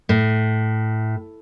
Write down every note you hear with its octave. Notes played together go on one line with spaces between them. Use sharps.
A2